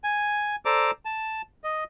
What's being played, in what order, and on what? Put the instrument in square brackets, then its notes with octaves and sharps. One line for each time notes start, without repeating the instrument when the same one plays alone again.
[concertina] G#5
A4 C5 D5 A#5 D6
A5
D#5